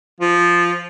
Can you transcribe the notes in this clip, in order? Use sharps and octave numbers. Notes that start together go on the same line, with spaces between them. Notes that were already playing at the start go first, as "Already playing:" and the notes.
F3